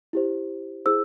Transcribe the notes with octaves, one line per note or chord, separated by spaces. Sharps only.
E4 G4 C5
E4 G#4 C5 E6